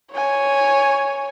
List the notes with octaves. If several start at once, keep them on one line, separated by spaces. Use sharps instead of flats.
C#5 G#5